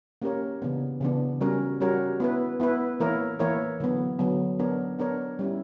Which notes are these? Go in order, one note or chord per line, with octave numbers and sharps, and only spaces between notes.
A#3 C#4 G4 A#4 C#5
C#3 E3 B3 D4
C#3 E3 B3 D4
G3 C#4 F#4 A#4 C#5
G3 C#4 F#4 A#4 C#5
B3 E4 B4
B3 E4 B4
E3 A#3 E4 A#4 C#5
E3 A#3 E4 A#4 C#5
D3 F#3 B3
D3 F#3 B3
B3 D4 A#4 C#5
B3 D4 A#4 C#5
G3 C#4 E4